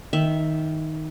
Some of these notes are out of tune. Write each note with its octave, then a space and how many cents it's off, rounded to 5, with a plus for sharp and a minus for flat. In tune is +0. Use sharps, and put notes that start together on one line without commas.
D#3 +10 E5 +0